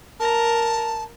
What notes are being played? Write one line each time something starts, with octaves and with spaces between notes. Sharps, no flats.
A#4 A5 A#5